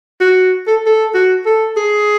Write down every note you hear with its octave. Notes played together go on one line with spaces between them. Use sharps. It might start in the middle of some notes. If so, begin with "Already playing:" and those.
F#4
A4
A4
F#4
A4
G#4